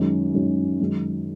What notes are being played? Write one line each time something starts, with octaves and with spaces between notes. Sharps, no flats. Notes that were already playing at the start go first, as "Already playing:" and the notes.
Already playing: F#2 D#3 G#3 C#4
F#2 D#3 G#3 C#4
F#2 D#3 G#3